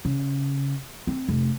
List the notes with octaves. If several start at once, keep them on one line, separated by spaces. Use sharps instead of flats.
C#3
C4
F1